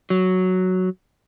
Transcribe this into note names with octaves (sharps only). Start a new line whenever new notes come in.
F#3